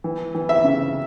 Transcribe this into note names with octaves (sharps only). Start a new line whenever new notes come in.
E3
E3
E5
C#3